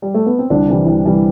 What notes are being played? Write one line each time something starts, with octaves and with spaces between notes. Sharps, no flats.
G3
A3
B3
C4
C2 D3 D4
C3 E3 G3
C2
C3 E3 G3